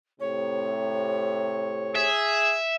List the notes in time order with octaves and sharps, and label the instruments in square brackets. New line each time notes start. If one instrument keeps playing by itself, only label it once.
[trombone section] A2 C3 [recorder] C#5
[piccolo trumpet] G#4 [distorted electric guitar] E5